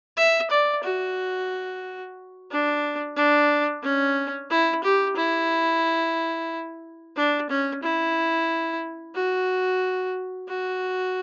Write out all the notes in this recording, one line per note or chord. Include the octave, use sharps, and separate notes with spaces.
E5
D5
F#4
D4
D4
C#4
E4
G4
E4
D4
C#4
E4
F#4
F#4